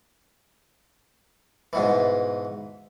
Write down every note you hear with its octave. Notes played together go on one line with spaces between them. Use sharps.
G#2 B2 E3